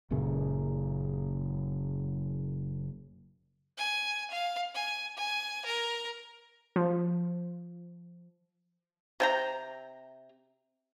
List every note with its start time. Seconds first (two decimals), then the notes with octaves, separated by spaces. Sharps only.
0.10 F#1 F#2 A#2 C#3
3.77 G#5
4.31 F5
4.74 G#5
5.16 G#5
5.65 A#4
6.76 F3
9.20 C3 G5 A#5